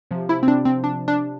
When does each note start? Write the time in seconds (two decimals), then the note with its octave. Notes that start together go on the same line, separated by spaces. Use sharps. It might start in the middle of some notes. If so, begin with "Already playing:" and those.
0.11 C3 F3
0.29 E4
0.43 C4
0.48 D4
0.65 C4
0.84 D4
1.08 D4